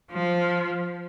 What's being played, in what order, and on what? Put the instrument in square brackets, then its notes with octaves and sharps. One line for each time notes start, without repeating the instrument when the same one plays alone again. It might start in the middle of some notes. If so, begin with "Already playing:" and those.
[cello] F3